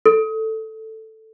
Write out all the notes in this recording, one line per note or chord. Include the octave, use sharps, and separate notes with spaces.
A4